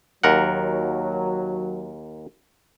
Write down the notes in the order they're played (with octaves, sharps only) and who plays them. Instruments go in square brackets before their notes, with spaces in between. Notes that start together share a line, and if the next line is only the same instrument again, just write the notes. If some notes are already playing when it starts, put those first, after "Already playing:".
[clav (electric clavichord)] D#2 A#4 F#5 [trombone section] F#3